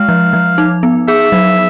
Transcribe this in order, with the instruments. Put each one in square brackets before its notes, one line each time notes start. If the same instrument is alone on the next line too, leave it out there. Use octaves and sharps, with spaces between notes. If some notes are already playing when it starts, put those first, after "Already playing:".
Already playing: [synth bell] G#3 [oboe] F5
[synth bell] F3
F3
D#4
B3
[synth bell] G#4 [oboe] E5
[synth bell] F#3